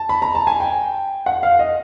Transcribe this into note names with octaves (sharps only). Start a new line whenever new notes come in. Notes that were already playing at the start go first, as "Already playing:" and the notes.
Already playing: A5
B5
A#5
A5
G#5
G5
F#5
F5
D#5